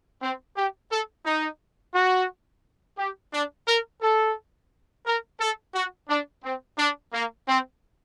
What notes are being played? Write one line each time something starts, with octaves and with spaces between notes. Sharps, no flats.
C4
G4
A4
D#4
F#4
G4
D4
A#4
A4
A#4
A4
F#4
D4
C4
D4
A#3
C4